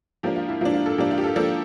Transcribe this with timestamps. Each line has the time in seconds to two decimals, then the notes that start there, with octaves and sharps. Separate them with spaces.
0.23 F3 A#3 D4 G4
0.36 F4
0.49 E4
0.61 F3 A#3 D4 F4
0.74 F4
0.86 A4
0.98 F3 A#3 D4 G4
1.11 F4
1.18 G4
1.24 A4
1.35 F3 A#3 D4 A4